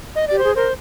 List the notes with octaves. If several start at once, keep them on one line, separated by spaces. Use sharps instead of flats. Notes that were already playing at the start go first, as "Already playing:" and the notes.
D#5
G4 D5
C5
G#4
A#4 C5